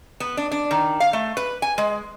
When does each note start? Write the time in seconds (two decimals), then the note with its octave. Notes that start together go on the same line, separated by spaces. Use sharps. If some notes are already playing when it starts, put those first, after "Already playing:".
0.20 B3
0.37 D4
0.52 D4
0.71 D#3
1.00 F5
1.13 A3
1.37 B4
1.62 G#5
1.78 G#3